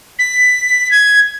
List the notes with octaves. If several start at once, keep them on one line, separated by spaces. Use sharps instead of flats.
B6
G#6